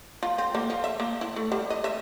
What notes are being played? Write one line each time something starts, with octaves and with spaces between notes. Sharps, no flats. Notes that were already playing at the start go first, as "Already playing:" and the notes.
F4
C4
A#3
F3
E5
A#3
E4
A3
G3
D#5
E5